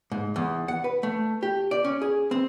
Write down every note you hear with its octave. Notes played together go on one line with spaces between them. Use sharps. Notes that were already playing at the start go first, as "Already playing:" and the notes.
G#2
E2
F#5
B4
A3
G4
D5
C#4
G#4
C4